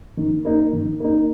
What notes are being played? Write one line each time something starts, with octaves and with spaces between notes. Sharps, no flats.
D#3
A#3 D#4
D#3
A#3 D#4